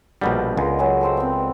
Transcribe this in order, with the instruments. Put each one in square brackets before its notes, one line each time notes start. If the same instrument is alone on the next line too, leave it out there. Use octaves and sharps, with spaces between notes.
[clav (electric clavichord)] A#1 B2 G3 [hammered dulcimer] D3 B3 A#4
[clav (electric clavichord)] C#2 [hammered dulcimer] G#3 A#4 B4
[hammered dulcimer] F#3 G#3 G#4
A4 C5 G5
B3 C4